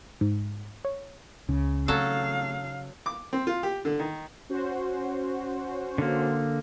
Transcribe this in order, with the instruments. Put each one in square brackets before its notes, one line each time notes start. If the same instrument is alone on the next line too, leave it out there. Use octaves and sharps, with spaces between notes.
[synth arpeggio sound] G#2
C#5
[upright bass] C#2 [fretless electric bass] C#3
[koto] F#3 A4 [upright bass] A3 C4 [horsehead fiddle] F5
[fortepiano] D6
C4
F4
G4
D3
D#3
[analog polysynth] C#4 F#4 C5
[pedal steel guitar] D3 A#3